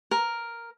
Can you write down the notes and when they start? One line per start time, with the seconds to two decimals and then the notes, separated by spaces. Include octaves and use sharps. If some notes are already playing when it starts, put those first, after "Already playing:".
0.11 A#4